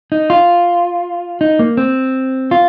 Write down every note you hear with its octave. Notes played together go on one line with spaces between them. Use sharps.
D#4
F4
D#4
A#3
C4
F4